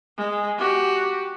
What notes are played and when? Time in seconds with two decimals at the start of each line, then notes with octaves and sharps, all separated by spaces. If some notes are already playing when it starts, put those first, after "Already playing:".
0.18 G#3
0.58 F#4 G4